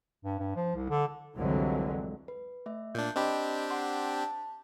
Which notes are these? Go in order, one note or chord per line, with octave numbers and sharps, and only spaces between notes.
G2
G2
F3
C2
D3
C2 F2 D3 E3 F#3 G#3
B4
A3 E5
A#2 D4 G6
C4 D4 G4 D#5 B5
F#5 A5 C6
A5